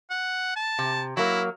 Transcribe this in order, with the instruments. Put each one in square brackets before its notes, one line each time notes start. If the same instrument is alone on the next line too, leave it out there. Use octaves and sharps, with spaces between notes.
[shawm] F#5
A5
[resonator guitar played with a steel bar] C3
[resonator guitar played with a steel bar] F#3 A#3 [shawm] E4